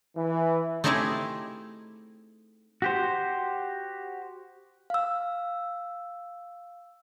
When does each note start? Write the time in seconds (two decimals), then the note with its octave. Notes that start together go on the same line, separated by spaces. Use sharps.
0.15 E3
0.84 A3 C4 D#4 E4 G4 G#4
2.82 F#4 G4 C5
4.90 F5 E6